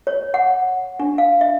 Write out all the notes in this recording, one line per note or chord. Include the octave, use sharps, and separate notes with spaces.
C#5
F#5
D4
F5
E5